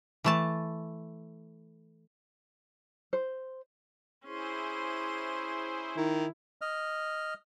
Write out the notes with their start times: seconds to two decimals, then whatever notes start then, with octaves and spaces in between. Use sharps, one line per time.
0.24 E3 A3 A5
3.13 C5
4.26 C#4 E4 G#4 C5 C6
5.97 D#3 E4
6.61 D#5 F6